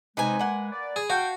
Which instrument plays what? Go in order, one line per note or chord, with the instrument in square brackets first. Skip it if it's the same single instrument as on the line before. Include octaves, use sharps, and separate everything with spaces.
[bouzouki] C3 D#4 C5 [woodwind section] G#3 [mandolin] B4 G#5
[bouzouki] A#3 F#5
[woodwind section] D5
[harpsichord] G#4
[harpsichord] F#4 [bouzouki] F5 A5 [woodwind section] G5